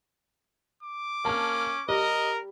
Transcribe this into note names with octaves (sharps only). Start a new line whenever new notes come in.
D6
A#3 C#4 A5 F6
G3 A#4 D#5